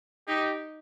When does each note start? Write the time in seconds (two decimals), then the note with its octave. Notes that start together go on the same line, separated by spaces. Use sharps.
0.28 D#4 G4